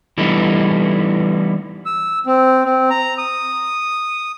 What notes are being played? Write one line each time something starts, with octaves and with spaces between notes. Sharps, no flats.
E3 G3 A3 B3 D4 D#4
E6
C4
C4
A#5
D#6